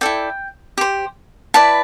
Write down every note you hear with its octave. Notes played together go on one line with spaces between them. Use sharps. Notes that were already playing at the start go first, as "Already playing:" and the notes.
E4 A4 D5 G5
G4 C5
E4 B4 D5 A5